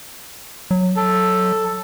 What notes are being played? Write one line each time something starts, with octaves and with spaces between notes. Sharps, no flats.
F#3
A4